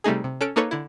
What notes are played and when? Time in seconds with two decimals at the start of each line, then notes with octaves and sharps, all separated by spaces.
0.04 C3 G3 A3 D#4 G#4
0.24 C3
0.41 C#4 A4 F#6 D7
0.56 A#3 D#4 A4 B4 C#5
0.71 D3 E4